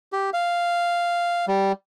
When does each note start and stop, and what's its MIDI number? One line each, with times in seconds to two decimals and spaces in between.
0.13 0.30 67
0.34 1.46 77
1.48 1.72 55